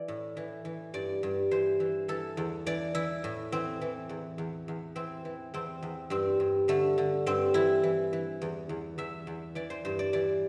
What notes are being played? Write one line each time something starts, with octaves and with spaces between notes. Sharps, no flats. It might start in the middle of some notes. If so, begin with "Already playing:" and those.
Already playing: E3 D5
A2
E3
E3
G2 D5
G2
E3 C5
E3
E3 A4
E2
E3 D5
E3 E4
A2
E3 C4
E3
E2
E2
E2
E3 C4
E3
E2 C4
E2
G2 C4
G2
D3 A3
D3
G2 C4
E3 E4
E3
E3
E2
E2
E2 E5
E2
E3 D5
C5
G2 C5
D5
E3 D5